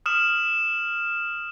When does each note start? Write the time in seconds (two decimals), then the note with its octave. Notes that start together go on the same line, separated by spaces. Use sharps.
0.06 D#6 F6 E7